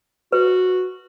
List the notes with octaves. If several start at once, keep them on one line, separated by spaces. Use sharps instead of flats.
F#4 B4